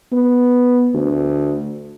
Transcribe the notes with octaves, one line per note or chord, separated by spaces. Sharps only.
B3
D2